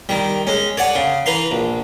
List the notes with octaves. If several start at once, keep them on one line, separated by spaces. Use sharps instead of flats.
D#3 G3
G#3 C#4
C#5 D5 F#5 G#5
C#3
E3 B4 A#5 C6
A#1